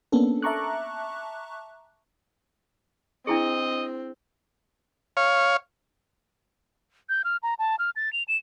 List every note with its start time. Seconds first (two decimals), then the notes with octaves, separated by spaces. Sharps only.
0.12 A#3 B3 C#4 D4 A4
0.42 E5 A5 A#5 C#6 D6 F#6
3.27 C4 D4 E4 G#4 D#5
5.17 C#5 F5
7.09 G6
7.24 F6
7.43 A#5
7.59 A5
7.79 F6
7.96 A6
8.13 F7
8.28 E7